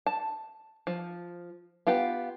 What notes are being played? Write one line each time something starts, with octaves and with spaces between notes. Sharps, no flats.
A5
F3
B3 F4 G4